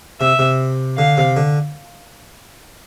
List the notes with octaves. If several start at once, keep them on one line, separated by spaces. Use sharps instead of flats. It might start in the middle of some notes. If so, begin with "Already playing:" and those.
C3 E5
C3
D3 F5
C3
D3